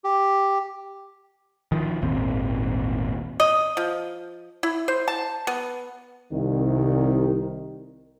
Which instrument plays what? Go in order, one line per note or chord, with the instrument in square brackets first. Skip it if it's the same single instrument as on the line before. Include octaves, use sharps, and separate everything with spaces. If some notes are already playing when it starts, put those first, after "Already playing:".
[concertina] G4
[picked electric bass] D#3 F3
G#1 D#2 A#2 C4
[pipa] D#5
F3
E4
C5
A5
B3
[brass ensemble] C2 [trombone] D#3